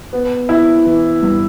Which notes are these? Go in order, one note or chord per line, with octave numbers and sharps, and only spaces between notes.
B3
E4
E3
G2